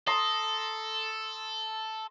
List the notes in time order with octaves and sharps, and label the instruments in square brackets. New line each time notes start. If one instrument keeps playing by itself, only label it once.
[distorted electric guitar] A4 [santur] A#5 C6 D#6